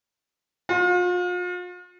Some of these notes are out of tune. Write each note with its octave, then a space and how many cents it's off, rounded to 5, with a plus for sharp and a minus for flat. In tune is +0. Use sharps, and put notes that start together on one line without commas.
F4 +40